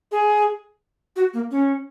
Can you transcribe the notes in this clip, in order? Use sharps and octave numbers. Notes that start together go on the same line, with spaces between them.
G#4
F#4
A#3
C#4